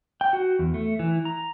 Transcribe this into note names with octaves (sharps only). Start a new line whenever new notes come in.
G5
F#4
E2
A3
E3
A#5